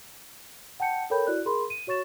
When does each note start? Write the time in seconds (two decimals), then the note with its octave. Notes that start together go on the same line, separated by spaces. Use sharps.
0.80 F#5 G5 A5 G6 C#7
1.10 A4 A#4 C#5 G5 B5 G6
1.27 E4 F#4 D5 F#6
1.45 G#4 A#4 B5 C6
1.70 D#7
1.87 F#4 C#5 C#6 A6 E7